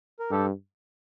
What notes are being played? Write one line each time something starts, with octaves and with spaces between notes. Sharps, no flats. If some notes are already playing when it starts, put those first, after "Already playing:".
A#4
G2 G4 A4